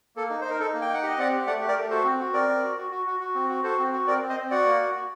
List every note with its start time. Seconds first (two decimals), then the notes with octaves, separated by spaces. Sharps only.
0.16 A#3 A4
0.30 D#4
0.41 D#4 C5
0.50 A#4
0.59 D#4 A4
0.74 A#3
0.82 G5
0.89 D#4 F#5
1.03 G4 D#5
1.18 C4 D5 F#5
1.32 G4
1.47 A3 D5 F#5
1.61 G4
1.68 A#4 D5
1.76 A3
1.90 F#4 A4 C5
2.04 C4
2.20 F#4
2.33 C4 A#4 D5
2.48 C4
2.63 F#4
2.77 F#4
2.91 F#4
3.06 F#4
3.20 F#4
3.35 C4
3.49 F#4
3.64 F#4 A4 C5
3.79 C4
3.92 F#4
4.07 C4 A#4 D5
4.22 C4
4.29 C5 D#5
4.37 C4
4.50 F#4 D5 F#5
4.65 A#3
4.81 F#4
4.95 F#4